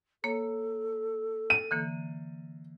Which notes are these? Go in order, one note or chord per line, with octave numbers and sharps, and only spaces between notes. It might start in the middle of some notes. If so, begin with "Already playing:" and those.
A#3 A4 C#5
D#7
D3 E3 A#3